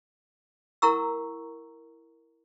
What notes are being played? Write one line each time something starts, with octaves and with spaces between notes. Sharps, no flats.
E4 A#4 F#5 A#5 C#6 E6